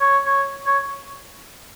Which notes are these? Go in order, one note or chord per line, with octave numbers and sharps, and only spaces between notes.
C#5
C#5
C#5